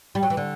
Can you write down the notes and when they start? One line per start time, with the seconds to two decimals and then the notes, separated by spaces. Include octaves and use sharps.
0.15 G3
0.23 F#3
0.30 E3
0.37 D3